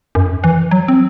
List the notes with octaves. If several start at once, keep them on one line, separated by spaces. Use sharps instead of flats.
F#2
E3
F#3
C4